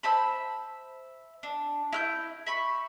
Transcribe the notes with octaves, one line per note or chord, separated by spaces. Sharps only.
C5 E5 A5 B5
D4
E4 F6 G6
E5 B5 C#6